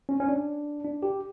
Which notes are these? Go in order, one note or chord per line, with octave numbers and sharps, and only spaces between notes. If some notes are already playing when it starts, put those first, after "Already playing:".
C#4
C#4
D4
D4
G4